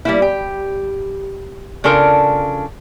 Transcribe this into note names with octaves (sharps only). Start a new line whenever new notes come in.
G3 A#3 E4
G4
C#3 D4 F4 A4 A#4